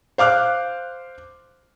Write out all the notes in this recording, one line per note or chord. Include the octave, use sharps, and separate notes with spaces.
C5 F5 D6 F6 F#6